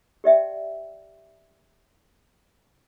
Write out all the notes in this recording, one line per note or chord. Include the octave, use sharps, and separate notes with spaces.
G4 D5 E5 G5